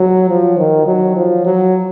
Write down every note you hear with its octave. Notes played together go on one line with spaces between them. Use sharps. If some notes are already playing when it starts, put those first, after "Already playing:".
Already playing: F#3
F3
D#3
F#3
F3
F#3